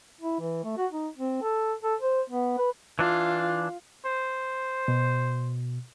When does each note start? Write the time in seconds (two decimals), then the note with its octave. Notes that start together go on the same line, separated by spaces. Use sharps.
0.21 E4
0.40 E3
0.64 A3
0.78 F#4
0.92 D#4
1.17 C4
1.42 A4
1.83 A4
2.01 C5
2.30 B3
2.58 B4
2.99 E3 D4 F4
4.05 C5
4.88 B2